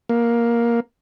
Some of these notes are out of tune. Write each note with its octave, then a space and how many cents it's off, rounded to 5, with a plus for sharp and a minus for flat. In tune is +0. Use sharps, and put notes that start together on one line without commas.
A#3 +10